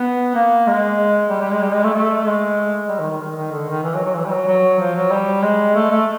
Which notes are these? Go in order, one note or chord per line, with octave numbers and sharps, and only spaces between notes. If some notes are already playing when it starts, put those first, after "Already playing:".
Already playing: B3
A#3
G#3
G3
G3
G#3
G3
G#3
A3
A3
G#3
G3
D#3
D#3
D#3
D#3
D3
D#3
E3
F#3
F#3
E3
G3
F#3
F#3
F3
F#3
G3
G#3
A3
A3